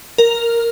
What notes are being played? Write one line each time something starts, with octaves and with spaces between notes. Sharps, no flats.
A#4